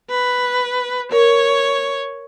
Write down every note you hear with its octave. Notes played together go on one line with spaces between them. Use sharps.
B4
A#4 C#5